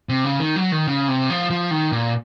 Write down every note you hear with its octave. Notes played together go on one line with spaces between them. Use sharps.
C3
C#3
D#3
F#3
D#3
C#3
C3
F3
F3
D#3
A#2